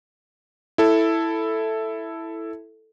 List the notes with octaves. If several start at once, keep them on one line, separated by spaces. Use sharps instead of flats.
E4 A4